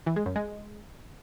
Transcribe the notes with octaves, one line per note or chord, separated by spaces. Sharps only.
E3
G#3
F#2
G#3